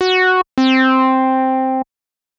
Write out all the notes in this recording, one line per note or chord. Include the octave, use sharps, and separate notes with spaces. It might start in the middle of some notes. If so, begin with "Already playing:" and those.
F#4
C4